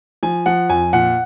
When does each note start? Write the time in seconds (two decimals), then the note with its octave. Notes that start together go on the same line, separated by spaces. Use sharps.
0.23 F3 G#5
0.46 F3 F#5
0.69 F2 G#5
0.93 A#2 F#5